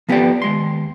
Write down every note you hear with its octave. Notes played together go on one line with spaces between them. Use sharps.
F3 B3 G4 B4 D5
D#2 G#3 C6